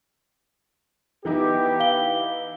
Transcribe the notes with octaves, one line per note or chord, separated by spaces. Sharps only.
E3 B3 D#4 E4 G4
F5 G7